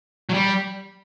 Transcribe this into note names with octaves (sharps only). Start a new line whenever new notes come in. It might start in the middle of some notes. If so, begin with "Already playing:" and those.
F#3
G3